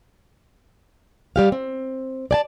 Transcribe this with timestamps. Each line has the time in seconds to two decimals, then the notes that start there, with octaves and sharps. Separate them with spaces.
1.36 G3 G4 F5
1.52 C4
2.31 D5 G#5 A5